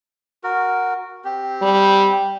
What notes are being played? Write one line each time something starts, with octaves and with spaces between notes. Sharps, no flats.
F#4 A#4
C4 G4
G3